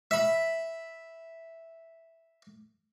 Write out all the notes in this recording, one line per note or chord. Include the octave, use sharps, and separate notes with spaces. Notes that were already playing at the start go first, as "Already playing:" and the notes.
E5 B5